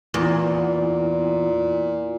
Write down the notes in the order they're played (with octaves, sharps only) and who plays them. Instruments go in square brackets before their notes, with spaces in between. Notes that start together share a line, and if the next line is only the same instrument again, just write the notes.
[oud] E2 [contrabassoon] A#2